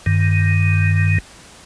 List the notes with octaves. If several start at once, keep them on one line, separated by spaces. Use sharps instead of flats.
G2 D#3